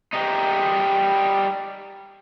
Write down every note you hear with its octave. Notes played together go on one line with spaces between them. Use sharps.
G3 D#4